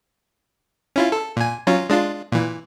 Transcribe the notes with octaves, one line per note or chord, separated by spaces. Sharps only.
C#4 E4 F4
A4
A#2 G#5
F#3 C#4 F4
G#3 D4 F4
A#2 E3